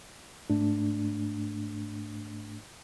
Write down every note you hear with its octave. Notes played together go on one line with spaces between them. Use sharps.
G#2 A3 D4